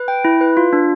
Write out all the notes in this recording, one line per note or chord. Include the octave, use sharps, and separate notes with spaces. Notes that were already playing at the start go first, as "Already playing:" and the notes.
Already playing: B4
G5
E4
B4
F4
D4